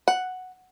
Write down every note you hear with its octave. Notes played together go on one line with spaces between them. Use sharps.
F#5